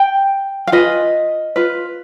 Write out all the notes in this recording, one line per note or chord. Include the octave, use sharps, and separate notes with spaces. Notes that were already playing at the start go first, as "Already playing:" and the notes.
Already playing: G5
F5
F4 G#4 B4 D#5
F4 B4